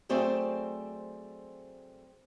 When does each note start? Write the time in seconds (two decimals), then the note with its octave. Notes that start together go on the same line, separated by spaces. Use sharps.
0.09 F#3 A3 C4 G#4 C5 D5